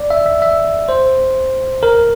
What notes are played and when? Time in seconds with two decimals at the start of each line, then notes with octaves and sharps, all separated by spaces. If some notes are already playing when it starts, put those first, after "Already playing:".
Already playing: D5
0.10 E5
0.26 E5
0.42 E5
0.89 C5
1.83 A#4